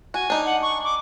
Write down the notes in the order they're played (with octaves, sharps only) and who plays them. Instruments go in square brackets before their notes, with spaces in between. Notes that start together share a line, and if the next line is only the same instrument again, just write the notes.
[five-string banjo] F#4 [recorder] G#5
[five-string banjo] D4 D#4
[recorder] F#5
C#6
D6